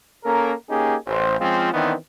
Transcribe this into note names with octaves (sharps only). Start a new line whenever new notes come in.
A#3 C#4 A4 A#4
A#3 C#4 D#4 G4 G#4
A1 C5
F3 G#3 C4 C#4 F4
D#3 E3 B3 C4 D4 D#4